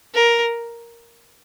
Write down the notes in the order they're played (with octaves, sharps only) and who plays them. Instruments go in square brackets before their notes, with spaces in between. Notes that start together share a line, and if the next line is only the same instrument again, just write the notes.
[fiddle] A#4